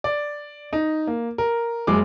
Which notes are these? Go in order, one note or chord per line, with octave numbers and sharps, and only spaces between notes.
D5
D#4
A#3
A#4
F#1 G#3 D6